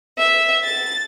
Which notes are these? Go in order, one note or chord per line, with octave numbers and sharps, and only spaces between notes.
E5
A6